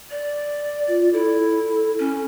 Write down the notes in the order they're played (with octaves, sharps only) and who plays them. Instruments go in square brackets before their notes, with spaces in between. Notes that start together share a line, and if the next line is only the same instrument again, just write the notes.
[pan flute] D5
[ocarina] F4
[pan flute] E4 [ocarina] A4
[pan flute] C#4